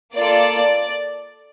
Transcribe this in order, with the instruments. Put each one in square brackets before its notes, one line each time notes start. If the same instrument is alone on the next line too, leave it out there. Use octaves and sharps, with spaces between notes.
[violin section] A#3 F4 A4 D5